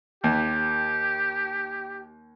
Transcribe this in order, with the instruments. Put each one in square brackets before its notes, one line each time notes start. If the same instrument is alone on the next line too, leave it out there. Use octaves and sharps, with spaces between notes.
[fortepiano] D#2 [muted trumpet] G4